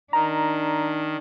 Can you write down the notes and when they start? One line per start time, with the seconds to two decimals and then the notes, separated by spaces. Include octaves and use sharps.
0.13 D#3 D4 A#5